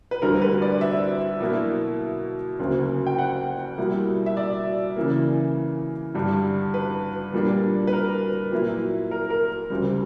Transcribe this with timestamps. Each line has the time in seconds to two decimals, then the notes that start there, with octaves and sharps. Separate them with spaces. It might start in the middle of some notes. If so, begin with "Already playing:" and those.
0.11 B4
0.22 D2 D3 G3 A#4
0.42 B4
0.62 D5
0.81 E5
1.41 B2 F#3 A#3 E4
2.59 D2 C#3 F#3 A#3
3.06 G5
3.18 F#5
3.78 B2 G3 A#3 E4
4.26 E5
4.37 D5
4.96 C#3 E3 A#3
6.15 G2 D3 G3
6.74 B4
7.34 A#2 G3 A#3 D4
7.87 B4
7.93 A#4
8.52 A#2 F#3 A#3 E4
9.11 A#4
9.30 A#4
9.70 D2 C#3 G3